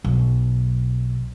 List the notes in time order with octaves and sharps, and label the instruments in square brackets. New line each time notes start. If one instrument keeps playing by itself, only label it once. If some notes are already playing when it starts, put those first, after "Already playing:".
[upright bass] B1